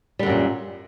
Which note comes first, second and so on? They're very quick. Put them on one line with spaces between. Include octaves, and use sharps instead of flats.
G3 D3 F#2 A#2